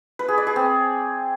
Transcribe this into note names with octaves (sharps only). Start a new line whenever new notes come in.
B4
G#4
D5
G#4
C4